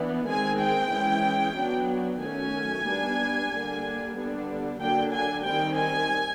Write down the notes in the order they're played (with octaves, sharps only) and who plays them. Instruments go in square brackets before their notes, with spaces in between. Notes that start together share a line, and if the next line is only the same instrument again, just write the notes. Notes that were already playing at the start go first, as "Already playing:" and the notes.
Already playing: [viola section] E3 B3 D4
D#3 G#3 C4 G#5
G5
E3 G#3 C#4
F#3 B3 D4
D#3 F#3 A3 C#4 G#5
G3 B3 D4
D3 G3 A#3 D4
D3 G3 B3 D4
D3 F#3 A#3 D4 G5
G#5
D#3 G3 C4 G5
G#5